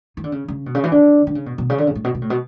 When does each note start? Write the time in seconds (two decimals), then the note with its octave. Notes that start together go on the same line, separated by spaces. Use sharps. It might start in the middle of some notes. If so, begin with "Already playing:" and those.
0.17 E3
0.24 D3
0.32 C#3
0.48 C#3
0.66 B2
0.75 C#3
0.84 E3
0.92 D3
1.27 D3
1.35 C#3
1.46 B2
1.58 B2
1.70 C#3
1.78 D3
1.87 C#3
1.95 A2
2.04 B2
2.15 B2
2.22 A2
2.30 B2